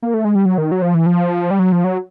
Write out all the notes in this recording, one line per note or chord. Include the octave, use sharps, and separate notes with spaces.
A#3
A3
G#3
G3
F#3
D#3
F#3
F3
E3
F3
G3
F#3
F3
F#3